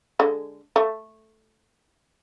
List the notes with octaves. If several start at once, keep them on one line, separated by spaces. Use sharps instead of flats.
D3 G#3
A3